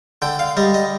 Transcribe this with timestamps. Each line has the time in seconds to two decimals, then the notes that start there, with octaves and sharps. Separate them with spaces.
0.22 D3 G5
0.39 F5
0.57 G3 D#5
0.74 D#5